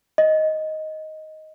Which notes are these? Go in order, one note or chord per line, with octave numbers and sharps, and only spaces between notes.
D#5